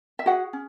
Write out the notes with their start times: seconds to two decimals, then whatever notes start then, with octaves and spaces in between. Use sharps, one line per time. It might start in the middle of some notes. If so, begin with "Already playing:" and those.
0.19 E5
0.26 F#4 G#4 F#5
0.53 C#4